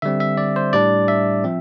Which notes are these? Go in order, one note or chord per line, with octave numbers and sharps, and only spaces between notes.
D3 G3 C4 E5
E5
D5
C5
A2 G3 D4 D5
E5
F3 C4